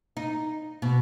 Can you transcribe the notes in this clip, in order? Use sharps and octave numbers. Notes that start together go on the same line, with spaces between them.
D#4
B2